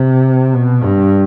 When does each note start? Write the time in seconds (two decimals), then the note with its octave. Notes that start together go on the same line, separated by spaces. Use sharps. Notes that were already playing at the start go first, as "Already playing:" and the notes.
Already playing: C3
0.54 B2
0.84 G2